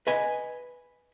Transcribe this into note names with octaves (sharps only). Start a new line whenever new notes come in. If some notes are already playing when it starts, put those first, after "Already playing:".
B4 D#5 G#5